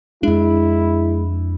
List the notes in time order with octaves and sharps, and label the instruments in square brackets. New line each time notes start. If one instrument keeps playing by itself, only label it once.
[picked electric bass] F2 D4 [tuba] G#3 [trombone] E4